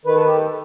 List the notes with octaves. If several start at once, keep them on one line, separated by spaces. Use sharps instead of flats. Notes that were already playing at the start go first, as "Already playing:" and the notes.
D#3 B4
A4
G4
A4